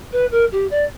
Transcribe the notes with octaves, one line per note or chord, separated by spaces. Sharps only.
B4
A#4
G4
D5